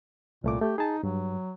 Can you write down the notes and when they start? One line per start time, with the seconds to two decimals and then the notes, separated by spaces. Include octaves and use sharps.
0.44 C2 A#2 A3 D6
0.61 A3 G4
0.78 D#4 G#4 A5
1.03 G2 F#3